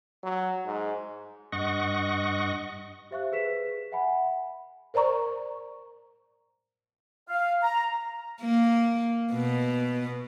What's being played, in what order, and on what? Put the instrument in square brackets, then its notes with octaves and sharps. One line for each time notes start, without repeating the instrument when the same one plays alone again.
[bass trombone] F#3
G#2
[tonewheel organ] G2 D#5 F#5 C#6
[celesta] G4 C5 E5 F5 C#6 F#6
G#4 B4 B6 E7
E5 F#5 G#5 B5
[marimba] A#4 C5 D5 A#5 C#6
[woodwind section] F5
A#5
[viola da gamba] A#3
B2